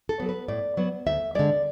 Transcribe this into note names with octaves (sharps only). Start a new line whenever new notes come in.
A4
F#3 B3
B4
A2 D5
F#3 B3
D2 E5
D3 G#3 D5